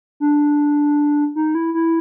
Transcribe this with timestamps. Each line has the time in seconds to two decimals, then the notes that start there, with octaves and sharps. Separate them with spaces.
0.20 D4
1.35 D#4
1.55 E4
1.74 E4